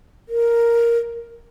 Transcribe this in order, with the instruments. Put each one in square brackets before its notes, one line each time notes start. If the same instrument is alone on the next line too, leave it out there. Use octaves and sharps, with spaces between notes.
[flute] A#4